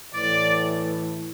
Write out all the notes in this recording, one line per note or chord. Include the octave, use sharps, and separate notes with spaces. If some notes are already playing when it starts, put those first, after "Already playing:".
A2 E3 D5